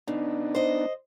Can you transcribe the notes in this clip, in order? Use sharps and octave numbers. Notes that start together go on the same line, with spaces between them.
C#3 B3 D4 D#4
C5 D#5